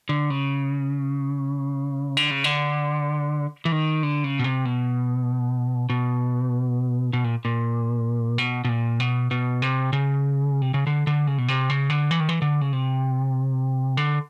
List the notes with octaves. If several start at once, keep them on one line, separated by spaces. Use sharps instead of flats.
D3
C#3
D3
C#3
D3
E3
D#3
D3
C#3
B2
C3
B2
B2
B2
A#2
A#2
B2
B2
A#2
B2
B2
C3
C#3
C3
C#3
D3
D3
C#3
B2
C3
C#3
D3
E3
D#3
E3
D3
C#3
C3
D3